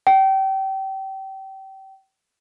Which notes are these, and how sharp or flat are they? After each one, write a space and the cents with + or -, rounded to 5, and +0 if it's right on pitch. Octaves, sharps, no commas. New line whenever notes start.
G5 -30